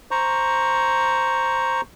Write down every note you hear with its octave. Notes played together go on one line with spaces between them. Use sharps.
C5 A#5 C#6